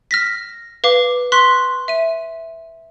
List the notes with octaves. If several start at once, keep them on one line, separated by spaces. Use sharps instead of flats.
F6 A#6 B6
B4 F5 D6
C6 C#6 F#6 B6
E5 D#7